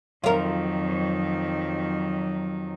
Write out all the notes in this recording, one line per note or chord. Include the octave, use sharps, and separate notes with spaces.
F2 D#3 F#3 F4 A#4